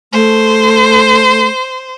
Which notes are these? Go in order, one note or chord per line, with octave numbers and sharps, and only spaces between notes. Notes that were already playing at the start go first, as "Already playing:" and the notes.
A3 C5